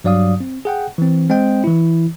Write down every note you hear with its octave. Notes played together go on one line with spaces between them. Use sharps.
G2 F#3 D5 F5 D#6
C4
G#4 F#5 G5
E3 C4
G#3 C4 D#5 G5
E3 E4